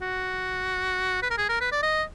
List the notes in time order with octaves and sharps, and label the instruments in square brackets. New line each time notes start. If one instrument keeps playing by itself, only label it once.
[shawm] F#4
B4
A#4
G#4
A#4
B4
D5
D#5